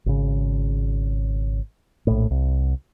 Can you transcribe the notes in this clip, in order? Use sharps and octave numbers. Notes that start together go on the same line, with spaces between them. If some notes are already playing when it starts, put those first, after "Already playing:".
G#1 C#3
A#1 A2
C2